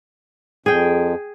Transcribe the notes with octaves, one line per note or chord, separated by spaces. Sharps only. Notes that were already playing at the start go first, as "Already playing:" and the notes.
F2 G#4 G5